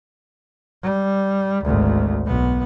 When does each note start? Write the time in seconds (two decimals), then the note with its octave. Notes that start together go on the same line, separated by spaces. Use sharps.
0.83 G3
1.64 G#1 D2
2.25 B1 B3